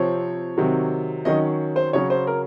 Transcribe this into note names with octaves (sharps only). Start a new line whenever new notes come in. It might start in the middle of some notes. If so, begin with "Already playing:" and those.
Already playing: C3 F3 C4 C#5
C3 D#3 F#3
D#3 F#3 C#4 D#5
C5
C#3 F#3 C#4 C#5
C5
A#4